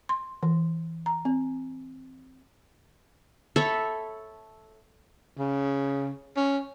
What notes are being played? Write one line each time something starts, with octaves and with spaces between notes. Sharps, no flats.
C6
E3
A#5
C4
A4 C#5 E5 B5
C#3
C#4